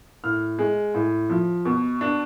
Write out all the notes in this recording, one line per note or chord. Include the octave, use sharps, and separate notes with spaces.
A2 F6
G#3
A2
F3
B2
D4